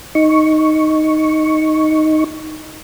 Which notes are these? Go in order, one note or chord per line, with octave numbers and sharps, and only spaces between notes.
D#4 C#6